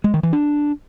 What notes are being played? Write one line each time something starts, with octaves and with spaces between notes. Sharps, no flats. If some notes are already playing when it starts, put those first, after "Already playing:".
G#3
D#3
E3
D4